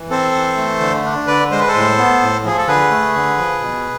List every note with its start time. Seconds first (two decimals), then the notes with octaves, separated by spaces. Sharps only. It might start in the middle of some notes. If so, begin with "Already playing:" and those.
Already playing: E3
0.10 C4 A4 C5
0.35 E3
0.57 A3
0.80 D3
1.05 D4
1.27 D3 B4 D5
1.52 G#3 C5
1.60 B4
1.67 A4 C5
1.75 A2
1.98 B3
2.21 A2
2.45 F3 G#4
2.58 A4
2.67 D3 G#4 B4
2.91 A3
3.15 D3
3.38 F3
3.61 B2